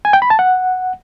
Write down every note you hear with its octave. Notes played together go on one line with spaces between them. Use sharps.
G#5
G5
B5
A5
F#5